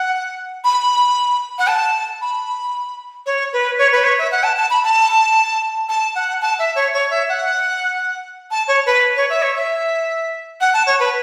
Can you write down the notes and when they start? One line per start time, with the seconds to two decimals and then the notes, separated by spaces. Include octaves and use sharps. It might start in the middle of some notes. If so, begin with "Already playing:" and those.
Already playing: F#5
0.64 B5
1.58 F#5
1.68 A5
2.21 B5
3.26 C#5
3.53 B4
3.78 C#5
3.92 B4
4.04 C#5
4.18 E5
4.32 F#5
4.44 A5
4.57 A5
4.70 B5
4.84 A5
5.89 A5
6.15 F#5
6.42 A5
6.59 E5
6.76 C#5
6.94 C#5
7.10 E5
7.29 F#5
8.51 A5
8.68 C#5
8.86 B4
9.16 C#5
9.30 E5
9.42 C#5
9.56 E5
10.61 F#5
10.74 A5
10.87 C#5
11.00 B4